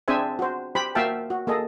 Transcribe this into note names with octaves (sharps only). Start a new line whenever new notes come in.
C4 D4 G#4 C5 E5 G#5
F#4 C5
G4 C5 B5
A#3 F#4 E5 F5 G5 A5
F#4
A#3 G#4 A4 D#5